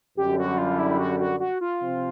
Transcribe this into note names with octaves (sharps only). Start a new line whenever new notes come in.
F#2 D3 G3 G4
F#4
F4
E4
F#4
F#4
F#4
F4
C3 F3 C4